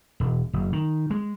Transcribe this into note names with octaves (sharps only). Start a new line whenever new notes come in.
E1
F#1
D#3
G#3